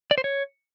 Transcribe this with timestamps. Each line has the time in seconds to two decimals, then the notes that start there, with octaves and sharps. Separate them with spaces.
0.11 D5
0.18 C5
0.24 C#5